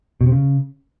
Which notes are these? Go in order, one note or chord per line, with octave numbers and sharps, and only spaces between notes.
B2
C3
C#3